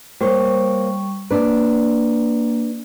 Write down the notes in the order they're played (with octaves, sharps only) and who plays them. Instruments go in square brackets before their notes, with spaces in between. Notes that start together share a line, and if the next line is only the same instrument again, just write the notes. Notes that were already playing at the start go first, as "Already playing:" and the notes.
[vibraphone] G3 C#6 [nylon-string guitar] A#3 C5 C#5
[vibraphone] A#3 [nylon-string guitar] D4 B4